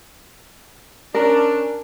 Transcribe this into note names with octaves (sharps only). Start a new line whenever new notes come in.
C#4 D4 A#4